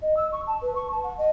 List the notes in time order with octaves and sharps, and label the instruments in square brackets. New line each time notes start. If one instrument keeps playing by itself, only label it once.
[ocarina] D#5
E6
C#6
A5
B4
C#6
A5
F#5
D#5